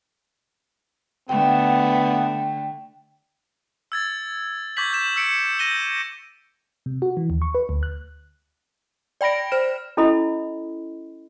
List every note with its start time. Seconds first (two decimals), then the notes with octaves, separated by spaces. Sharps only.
1.29 D3 A3 B3 G5
3.92 E6 G#6 A6
4.77 C#6 D6 G6 G#6 B6 F#7
4.93 G6 B6 E7
5.16 E6 B6 C#7 D7
5.59 G6 A#6 D#7 G7
6.86 C3
7.02 F#4
7.17 E3
7.30 D#2
7.42 C#6
7.55 B4
7.69 D2
7.83 F#6
9.21 D5 G5 B5 A#6 D7
9.52 C5 F6 E7
9.97 C#4 E4 A4 D#5 B5